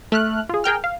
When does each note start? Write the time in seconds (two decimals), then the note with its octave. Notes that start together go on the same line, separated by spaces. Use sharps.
0.12 A3 F6 F#6
0.49 F4 G#4
0.64 G#4 A#4 G5 F6
0.84 F5